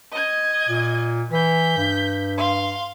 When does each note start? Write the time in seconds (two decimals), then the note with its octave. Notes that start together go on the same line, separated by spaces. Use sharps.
0.12 D#5 G#6
0.69 A#2
1.32 E3 G6 B6
1.78 G2
2.38 F5 C6